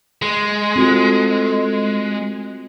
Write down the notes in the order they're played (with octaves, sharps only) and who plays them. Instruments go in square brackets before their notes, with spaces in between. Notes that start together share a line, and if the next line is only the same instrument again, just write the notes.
[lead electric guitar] G#3
[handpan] C4 F4 F#4 [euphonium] A4